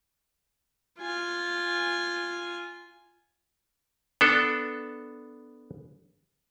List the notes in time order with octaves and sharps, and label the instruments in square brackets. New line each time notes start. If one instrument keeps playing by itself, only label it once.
[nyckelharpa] F4 G#5
[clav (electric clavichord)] B3 D4 A4